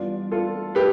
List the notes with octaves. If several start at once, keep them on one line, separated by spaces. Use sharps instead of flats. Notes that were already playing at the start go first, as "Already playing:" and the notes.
Already playing: G2 E3 B3 D4 F4
F4 A4
G4 B4